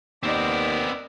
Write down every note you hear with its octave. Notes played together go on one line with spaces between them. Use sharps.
D#2 B3 C4 A#4 D5 D#5